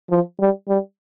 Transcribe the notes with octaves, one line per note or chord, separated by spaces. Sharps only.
F3
G3
G3